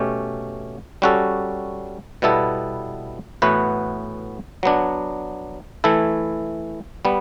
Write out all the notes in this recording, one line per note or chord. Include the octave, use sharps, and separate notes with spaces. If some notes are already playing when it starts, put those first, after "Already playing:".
Already playing: B2 A3 C#4 G4
G3 C#4 F#4 A4
B2 G3 B3 E4 A4
A2 E3 B3 F#4 B4
F#3 B3 D4
E3 A3 E4 A4
G3 B3